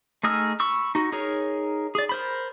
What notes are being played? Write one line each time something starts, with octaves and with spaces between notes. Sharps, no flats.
A3 D#4 G#4 E6 F6
B5 C#6 E6
D#4 F#4
D#4 G#4 A#4 C#5
G#4 D5
A#4 C5 B5